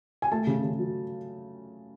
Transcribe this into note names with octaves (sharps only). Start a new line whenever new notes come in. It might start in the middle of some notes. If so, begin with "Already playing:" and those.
G#5
A3 A5
C#3
C#3
F#3